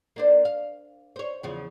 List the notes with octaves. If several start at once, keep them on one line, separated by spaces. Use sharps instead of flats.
A#3 D4 C5
F5
C5 C#5
E2 C#3 F3